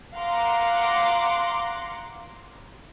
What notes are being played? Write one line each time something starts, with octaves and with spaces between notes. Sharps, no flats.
F5 F#5 A#5 C6 D6